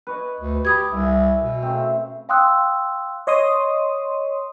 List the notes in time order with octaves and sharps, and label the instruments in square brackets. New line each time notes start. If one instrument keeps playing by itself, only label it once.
[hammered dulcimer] B4 C#5 D#5
[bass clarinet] D2
[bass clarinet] G4 [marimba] B5 D#6 G#6
[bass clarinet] C2 [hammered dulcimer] E4 G#5
[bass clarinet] B2
[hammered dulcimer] C#3 A3 C4
[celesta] F5 G5 C6 D#6 E6 F#6
[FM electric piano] C#5 D#5 C6 D#6